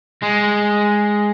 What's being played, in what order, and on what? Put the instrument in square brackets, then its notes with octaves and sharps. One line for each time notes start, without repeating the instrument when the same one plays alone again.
[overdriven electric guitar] G#3